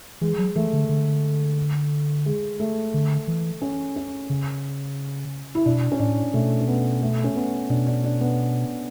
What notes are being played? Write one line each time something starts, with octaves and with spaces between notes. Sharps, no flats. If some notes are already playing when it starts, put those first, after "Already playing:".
E3 G#3
F#3
E3 A3
D3
D3
G#3
A3
D3
E3
C#4
C#4
C#3
E4
B2 D4
C#4
A2 D4
B2 A3
C#4
B3
A3
C#4
B3
B2 D4
D4
D4
B3